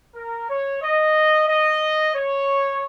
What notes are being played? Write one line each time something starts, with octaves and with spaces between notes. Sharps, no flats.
A#4
C#5
D#5
D#5
C#5